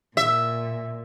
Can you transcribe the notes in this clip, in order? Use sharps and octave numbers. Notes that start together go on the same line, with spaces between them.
A#2 E5